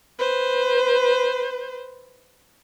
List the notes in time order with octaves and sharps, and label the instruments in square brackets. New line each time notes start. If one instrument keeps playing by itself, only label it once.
[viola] B4 C5